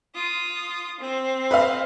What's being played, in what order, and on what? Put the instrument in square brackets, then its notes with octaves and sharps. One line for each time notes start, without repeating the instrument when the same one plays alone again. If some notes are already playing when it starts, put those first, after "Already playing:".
[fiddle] F4 D#6
C4
[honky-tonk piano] B4 D#5 F5